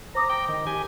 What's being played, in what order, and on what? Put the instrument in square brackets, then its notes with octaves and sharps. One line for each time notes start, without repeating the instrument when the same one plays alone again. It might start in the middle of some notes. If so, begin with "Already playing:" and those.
[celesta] C5 D6 D#6 [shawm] A#5
[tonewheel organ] G5
D#3
G4 G#5